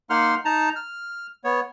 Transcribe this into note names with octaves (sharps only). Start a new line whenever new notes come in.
A#3 D#4 F#5 C6 F6
D#4 A5 A#5
F6
B3 C#5